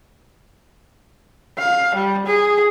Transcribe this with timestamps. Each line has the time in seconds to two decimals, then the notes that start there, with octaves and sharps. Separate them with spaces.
1.58 F5
1.95 G3
2.27 G#4